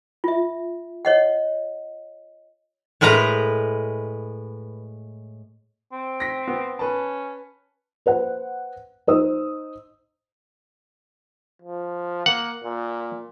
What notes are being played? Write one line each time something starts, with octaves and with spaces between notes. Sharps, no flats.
F4 E5
C#5 D#5 F#5
A2 G#3 A#4 B4 A#5
C4
A#6 B6
B3
C#4 B4 A5
B4 C5 F#5
D#4 C5 D#6 E6
F3
A#3 F#5
A#2